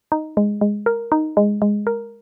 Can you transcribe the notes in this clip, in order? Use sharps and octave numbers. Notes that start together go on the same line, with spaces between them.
D#4
G#3
G#3
A#4
D#4
G#3
G#3
A#4